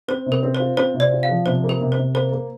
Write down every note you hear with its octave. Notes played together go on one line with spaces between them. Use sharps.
C4 C5
C3
A#4
C4
C5
F4
C4 C5
C3
D5
F4
F5
F3
C3 C5
A#3
A#4
C3
C5
C3
A#3 C5
A#3